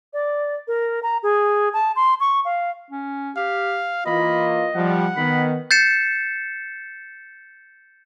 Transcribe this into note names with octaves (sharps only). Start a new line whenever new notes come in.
D5
A#4
A#5
G#4
A5
C6
C#6
F5
C#4
G4 F5
E3 A#3 F4 D#5 B5
F3 G3 F#5
D#3 B3 B5
G6 A6 C7 C#7 E7